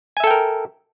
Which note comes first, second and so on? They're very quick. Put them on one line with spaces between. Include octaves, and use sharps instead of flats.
G#5 E5 A4 G5 A#4